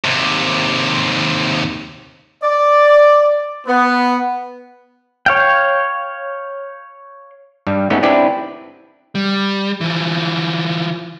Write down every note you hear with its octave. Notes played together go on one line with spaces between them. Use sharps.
D#2 C3
D5
B3
C#5 F5 G5
G2 G3
G#3 A3 B3 C#4 D#4
C4 D4 E4 G4 B4 D5
G3
E3 F3